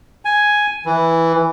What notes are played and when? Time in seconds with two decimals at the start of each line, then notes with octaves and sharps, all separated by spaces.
0.25 G#5
0.86 E3